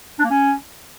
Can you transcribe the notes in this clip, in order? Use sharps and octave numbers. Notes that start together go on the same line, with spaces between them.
D4
A#3
C#4